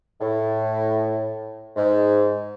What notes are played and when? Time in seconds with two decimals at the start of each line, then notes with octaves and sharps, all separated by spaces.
0.21 A2
1.77 G#2